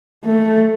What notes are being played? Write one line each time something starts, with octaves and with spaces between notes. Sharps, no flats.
A3